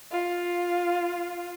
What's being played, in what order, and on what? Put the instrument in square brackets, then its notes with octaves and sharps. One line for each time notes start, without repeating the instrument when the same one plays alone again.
[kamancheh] F4